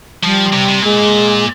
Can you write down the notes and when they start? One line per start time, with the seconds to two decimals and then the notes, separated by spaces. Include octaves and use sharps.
0.23 F3 G3
0.53 C3
0.69 C3
0.82 A#2 G#3